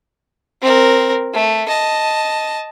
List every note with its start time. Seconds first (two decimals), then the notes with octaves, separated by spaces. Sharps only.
0.62 C4 A#4
1.34 A3
1.68 D#5 A5